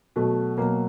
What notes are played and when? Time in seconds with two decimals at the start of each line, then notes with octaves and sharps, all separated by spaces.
0.16 B2 F#3 A3
0.57 B2 F#3 A#3